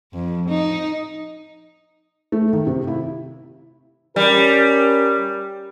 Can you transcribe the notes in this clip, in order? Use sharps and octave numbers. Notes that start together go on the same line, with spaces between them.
F2
D#4
A3
D#3
C3
E4
G3 C#4 G4 A#4